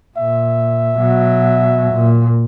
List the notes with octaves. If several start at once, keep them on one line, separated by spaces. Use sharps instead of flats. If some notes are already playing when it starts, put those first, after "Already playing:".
A#2 E5
B2 F#3
A#2